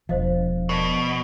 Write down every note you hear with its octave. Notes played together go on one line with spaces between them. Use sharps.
E1 D3 F3 C5 D#5 F5
B2 A#4 D5 A5